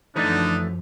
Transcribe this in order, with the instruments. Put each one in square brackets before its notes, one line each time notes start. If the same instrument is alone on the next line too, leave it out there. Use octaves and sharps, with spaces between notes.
[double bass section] F#2 F3 [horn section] D3 D#4 [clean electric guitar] E3 A3 [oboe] D4